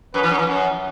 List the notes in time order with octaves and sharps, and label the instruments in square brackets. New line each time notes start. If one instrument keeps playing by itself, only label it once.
[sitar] F#2 [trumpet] B4
[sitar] E3
F#2
E3
F#2